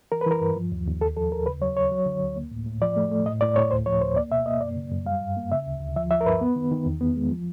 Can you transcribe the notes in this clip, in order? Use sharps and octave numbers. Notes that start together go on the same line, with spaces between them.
E3 A#4
B4
E3 A#4
G2
F3
D#2
D#2
D#2 A4
F3 A4
D#2 A#4
C#3 B4
F#3 C#5
C#2 C#5
F#3
D3
D2
A#3
A2
A2
F3 D5
A3
A3
A2 D#5
A2 D5
A2 C#5
D2 C5
F3 C#5
D2 C5
A#3 D5
B2 E5
A#3 D#5
F#2 D5
C#3
F#2
G3 F5
G2
A#3
C#3 E5
D2
D2
F3 E5
F3 E5
A#4
G2 B4
B3
D#3
D#3
E2
B3
G#3
F3